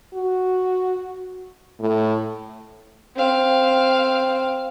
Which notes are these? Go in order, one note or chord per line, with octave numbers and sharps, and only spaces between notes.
F#4
A2
C4 F5